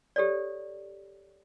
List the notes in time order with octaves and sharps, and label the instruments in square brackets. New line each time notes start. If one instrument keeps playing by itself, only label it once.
[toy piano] G4 A4 C#5 D5